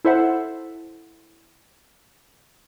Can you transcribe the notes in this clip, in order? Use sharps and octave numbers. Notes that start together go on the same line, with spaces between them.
E4 A4 C5 E5 F#5